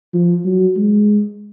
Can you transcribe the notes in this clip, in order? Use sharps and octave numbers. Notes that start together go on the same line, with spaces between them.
F3
F#3
G#3